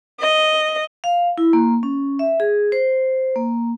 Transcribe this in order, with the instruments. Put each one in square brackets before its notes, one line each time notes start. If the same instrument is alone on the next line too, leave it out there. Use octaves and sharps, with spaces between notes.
[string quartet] D#5
[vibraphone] F5
E4
A#3
C#4
E5
G#4
C5
A#3